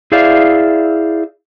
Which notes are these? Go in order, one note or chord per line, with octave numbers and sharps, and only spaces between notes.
E4 G#4 C5 D5 E5 F5